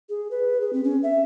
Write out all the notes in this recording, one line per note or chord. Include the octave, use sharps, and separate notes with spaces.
G#4
B4
G#4
C4
C#4
E5